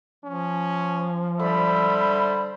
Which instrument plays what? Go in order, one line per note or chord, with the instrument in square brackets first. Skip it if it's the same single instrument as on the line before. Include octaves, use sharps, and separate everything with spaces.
[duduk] F3 [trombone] C#4
[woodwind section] D3 G3 [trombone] C5 [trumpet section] E5 B5